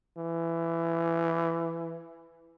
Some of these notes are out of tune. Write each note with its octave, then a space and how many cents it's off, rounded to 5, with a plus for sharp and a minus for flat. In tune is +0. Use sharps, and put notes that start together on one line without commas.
E3 +15